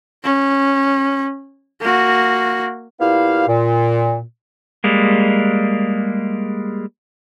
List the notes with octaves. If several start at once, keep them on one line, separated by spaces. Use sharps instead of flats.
C#4
A#3 F#4
A#2 B3 E4 G4 F5
A#2
G3 G#3 A#3